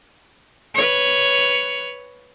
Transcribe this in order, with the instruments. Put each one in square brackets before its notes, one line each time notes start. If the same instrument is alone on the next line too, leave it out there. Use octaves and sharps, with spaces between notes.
[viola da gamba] B4 C#5